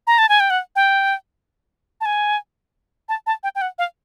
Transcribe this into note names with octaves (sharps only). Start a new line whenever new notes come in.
A#5
A5
G#5
G5
F#5
G5
A5
G#5
A5
A5
G5
G5
F#5
F5